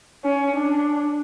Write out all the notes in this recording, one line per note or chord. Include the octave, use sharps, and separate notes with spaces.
C#4
D4